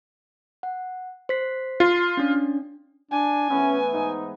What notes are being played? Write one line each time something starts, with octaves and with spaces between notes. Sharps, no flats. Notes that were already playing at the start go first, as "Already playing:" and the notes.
F#5
C5 B6 C7
F4 C6 C7
C#4 D4
D4 G5 G#5
E3 A3 B3 C#4
G#2 D#4